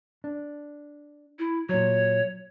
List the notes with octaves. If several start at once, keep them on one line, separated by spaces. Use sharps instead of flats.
D4
E4
A#2 F#3 C#5